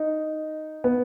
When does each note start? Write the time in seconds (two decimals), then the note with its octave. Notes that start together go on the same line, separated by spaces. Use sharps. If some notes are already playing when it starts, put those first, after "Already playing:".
Already playing: D#4
0.84 B3